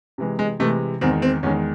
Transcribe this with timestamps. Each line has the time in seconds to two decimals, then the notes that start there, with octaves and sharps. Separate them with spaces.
0.18 C3 E3 G#3
0.39 G#3
0.60 C3 E3 G#3 A3
1.01 E2 D#3 G#3 C4
1.22 C4
1.43 E2 D#3 G#3 C#4